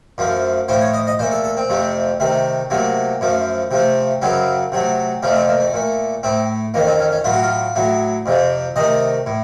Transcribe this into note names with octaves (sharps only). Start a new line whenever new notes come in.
F#2 F3 A3
A2 F3 A3 C5
C#5
D#5
D#5
A#2 A3 C5
A4
A4
C4
F2 C3 F3 A3
C3 D#3 A3
C3 F#3 A3 A#3
F#2 F3 A3
C3 F3 A3
F#2 C#3 F#3 C4
C3 F#3 A3
F2 C3 F3 A3 C#4
C4
A#3
A3
A#2 A3
A2 A3 C4
F2 D#3 A3 A#3
C4
C#4
C#4
A2 F#3 A3 F4
F#4
F4
A2 F#3 A3
F2 C3 F3
C3 D#3 A3 D#5
A2